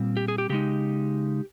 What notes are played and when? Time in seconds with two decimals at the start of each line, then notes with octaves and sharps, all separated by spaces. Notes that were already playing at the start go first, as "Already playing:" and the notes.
Already playing: A#2 G3 C4
0.17 G4
0.28 G#4
0.38 G4
0.49 C#3 G#3 D#4 G4